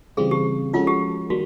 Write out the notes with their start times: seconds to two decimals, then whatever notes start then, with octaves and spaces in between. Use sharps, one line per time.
0.17 C#3 E3 G3 C4 F4 G#4
0.31 G4
0.73 F3 G#3 C#4 F4 F#4 A4
0.87 G4
1.30 D#3 G3 A#3 F#4